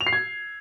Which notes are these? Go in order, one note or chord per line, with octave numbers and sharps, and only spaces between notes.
F7
C7
G#6